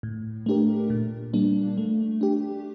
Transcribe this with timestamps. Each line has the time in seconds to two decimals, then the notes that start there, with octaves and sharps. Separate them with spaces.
0.03 A2
0.46 A3 D4 G4 A#4
0.90 A#2
1.33 G3 A#3 D4
1.78 A3
2.21 D4 G4